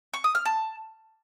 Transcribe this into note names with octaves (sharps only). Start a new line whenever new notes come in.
C#6
D#6
F6
A5